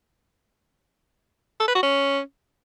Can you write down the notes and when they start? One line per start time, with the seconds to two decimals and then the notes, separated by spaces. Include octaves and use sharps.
1.60 A4
1.68 B4
1.75 F#4
1.83 C#4